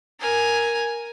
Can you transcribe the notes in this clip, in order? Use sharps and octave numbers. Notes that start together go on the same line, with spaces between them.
A#4 G#5